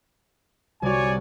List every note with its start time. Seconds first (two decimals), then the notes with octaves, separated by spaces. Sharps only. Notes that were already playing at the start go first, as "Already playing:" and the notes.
0.82 C2 F#4 C#5 D5 G#5